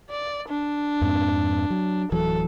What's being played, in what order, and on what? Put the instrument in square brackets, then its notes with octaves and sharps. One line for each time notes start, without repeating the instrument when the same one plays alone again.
[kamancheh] D5
D4
[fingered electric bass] F2 G#2 C4
F#3
[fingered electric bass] D1 E3 F#3 [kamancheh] A4